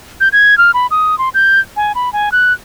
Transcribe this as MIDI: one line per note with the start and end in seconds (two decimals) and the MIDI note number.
0.21 0.29 91
0.33 0.57 92
0.58 0.71 89
0.74 0.87 83
0.91 1.18 87
1.18 1.29 84
1.34 1.60 91
1.76 1.92 80
1.95 2.12 83
2.13 2.29 80
2.32 2.53 90